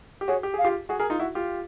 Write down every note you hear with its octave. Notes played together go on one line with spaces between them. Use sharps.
G4
F#4 G#4 C#5
G4
G#4 F5
F4 G4
F#4 G#4
G#4 A#4
D#4 F4
E4 F#4
F4 G4